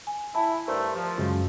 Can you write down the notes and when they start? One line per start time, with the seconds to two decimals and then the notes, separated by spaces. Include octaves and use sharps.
0.07 G#5
0.35 E4 A5 B5
0.68 G2 A3 A#4 C5
0.95 F3
1.18 F#2 C#3 F#3 G#3